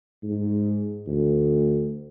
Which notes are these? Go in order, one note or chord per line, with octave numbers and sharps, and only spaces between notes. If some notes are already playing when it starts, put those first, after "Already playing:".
G#2
D2